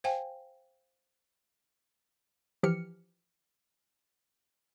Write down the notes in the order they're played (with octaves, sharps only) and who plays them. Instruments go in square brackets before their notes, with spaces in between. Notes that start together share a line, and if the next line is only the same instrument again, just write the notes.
[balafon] C5 F5 G5 G#5
[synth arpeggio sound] E3 F3 G4 F6 C#7